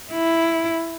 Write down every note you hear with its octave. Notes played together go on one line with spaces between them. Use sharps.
E4